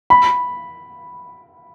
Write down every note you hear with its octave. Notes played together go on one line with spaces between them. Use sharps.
B5